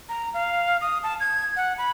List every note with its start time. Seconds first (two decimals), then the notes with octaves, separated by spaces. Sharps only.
0.09 A#5
0.34 F5
0.81 D#6
1.03 A5
1.20 G#6
1.56 F#5
1.78 B5